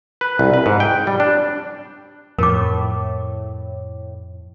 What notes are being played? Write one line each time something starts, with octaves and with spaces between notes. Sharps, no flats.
B4
C2
B4
G#2
G5
G3
D4
F2 A2 A#4 D6